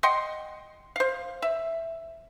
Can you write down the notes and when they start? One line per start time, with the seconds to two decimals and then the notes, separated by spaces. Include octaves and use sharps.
0.03 D#5 F#5 G5 C6
0.96 C5 F5
1.42 E5